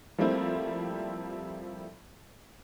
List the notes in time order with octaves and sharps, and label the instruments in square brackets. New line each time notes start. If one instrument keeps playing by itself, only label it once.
[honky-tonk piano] F3 G3 A3 A#3 C4 E4